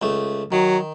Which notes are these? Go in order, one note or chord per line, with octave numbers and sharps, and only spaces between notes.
C#2 A3
D#3 F#3